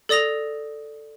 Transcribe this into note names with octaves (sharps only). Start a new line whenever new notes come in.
A4 D5 D#6 A#6 F7